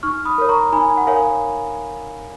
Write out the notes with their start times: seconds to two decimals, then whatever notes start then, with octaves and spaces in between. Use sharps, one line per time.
0.03 D#4 C#6 F6
0.25 B5 D#6
0.38 A#4 C#5
0.49 A#5 C#6
0.73 D#4 G#5 B5
0.97 F#5
1.07 A#4 C#5 F5 G#5